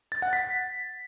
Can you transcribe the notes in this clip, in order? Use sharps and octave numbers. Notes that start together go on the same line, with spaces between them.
A6
F#5
B6